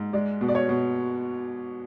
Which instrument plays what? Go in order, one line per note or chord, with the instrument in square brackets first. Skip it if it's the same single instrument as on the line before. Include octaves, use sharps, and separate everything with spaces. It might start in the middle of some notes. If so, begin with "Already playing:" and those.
Already playing: [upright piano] G#2
G#3 D5
B2
D5
C#5
B2